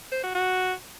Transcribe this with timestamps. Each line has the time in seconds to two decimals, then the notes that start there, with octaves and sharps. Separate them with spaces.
0.12 C5
0.23 F#4
0.35 F#4